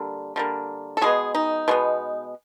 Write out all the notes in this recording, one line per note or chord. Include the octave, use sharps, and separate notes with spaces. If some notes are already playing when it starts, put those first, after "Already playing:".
Already playing: D3 G3 A#3
D3 G3 A#3
A4
B2 G#3 B3 G#4
D#4
B2 G#3 B3